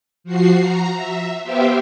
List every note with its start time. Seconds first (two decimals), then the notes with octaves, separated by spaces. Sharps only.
0.24 F3 F#4 C7
0.59 A#5
0.94 E5
1.43 B3 G4 C5 E5 F5 G5